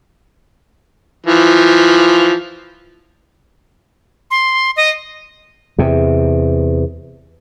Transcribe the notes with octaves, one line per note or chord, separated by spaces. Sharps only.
E3 F3
C6
D#5
E2 C3